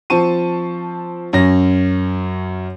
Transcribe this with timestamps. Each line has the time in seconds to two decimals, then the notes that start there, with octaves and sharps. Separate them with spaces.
0.10 F3 C4 A5 C#6 D#7
1.33 F#2 C#4 A#6